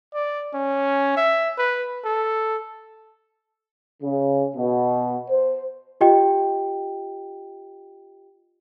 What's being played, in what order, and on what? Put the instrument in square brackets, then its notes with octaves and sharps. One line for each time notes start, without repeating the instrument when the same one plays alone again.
[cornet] D5
C#4
E5
B4
A4
[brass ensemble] C#3
B2
C5
[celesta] F4 G4 D#5 G5